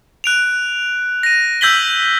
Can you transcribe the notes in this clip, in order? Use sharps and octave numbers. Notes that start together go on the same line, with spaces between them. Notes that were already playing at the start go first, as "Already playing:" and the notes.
F#6 D7 F7
A#6 D#7
E6 G6 G#6 B6 F#7 G7